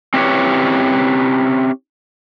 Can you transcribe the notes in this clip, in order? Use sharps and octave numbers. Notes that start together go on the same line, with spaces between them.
C4 C#4 E4 G4 B4 C#5